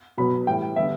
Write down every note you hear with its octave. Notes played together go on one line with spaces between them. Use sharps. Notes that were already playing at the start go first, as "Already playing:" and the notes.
B2 F#3 B3 B5
A2 E3 G3 G5
D3 G3 B3 E5